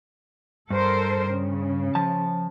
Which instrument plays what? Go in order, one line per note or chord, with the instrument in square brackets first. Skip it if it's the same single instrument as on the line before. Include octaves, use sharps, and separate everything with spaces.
[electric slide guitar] G2 [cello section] A4 A#4 C5
[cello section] C#3
[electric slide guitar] F3 A5